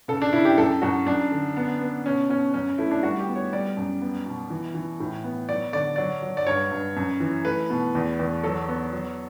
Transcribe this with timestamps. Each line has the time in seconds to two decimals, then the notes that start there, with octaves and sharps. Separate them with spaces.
0.08 C#3 A4
0.22 D4
0.33 C#3 E4
0.45 G4
0.58 F#2 A4
0.82 F#2 F#4
1.06 F#2 D4
1.32 D3
1.57 B3
1.81 B3
2.06 B2 C#4
2.29 B2 C#4
2.54 F#2 C#4
2.78 A3 E4
2.91 D4
3.03 G3 F#4
3.20 G4
3.28 B3
3.36 C#5
3.53 G3 D5
3.77 F#2
4.01 B3
4.26 B2
4.50 E3
4.75 E3
5.00 A2
5.24 B3
5.49 F#3 D5
5.73 D3 D5
5.96 F#3 D5
6.23 F#3
6.37 D5
6.47 G2 C#5
6.71 G2
6.97 F#2
7.20 E3
7.45 A3 B4
7.70 B2
7.95 E2
8.19 E2
8.44 F#3 A4
8.68 B3
8.93 F#3